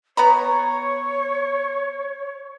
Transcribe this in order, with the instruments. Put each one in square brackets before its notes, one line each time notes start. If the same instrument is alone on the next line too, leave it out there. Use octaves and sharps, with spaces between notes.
[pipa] B3 A#5 B5 [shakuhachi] C#5